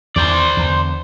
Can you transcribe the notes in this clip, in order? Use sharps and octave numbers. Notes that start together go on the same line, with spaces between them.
E2 D#3 C5 D5
E2 D3